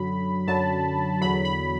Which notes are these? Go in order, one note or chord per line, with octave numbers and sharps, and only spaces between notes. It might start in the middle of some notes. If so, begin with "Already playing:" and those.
Already playing: F#2 D3 F#3 B5
F#2 D3 F#3 A5
E2 D3 F#3 B5
B5